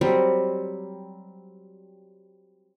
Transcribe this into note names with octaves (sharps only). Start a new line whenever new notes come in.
F#3 G3 C4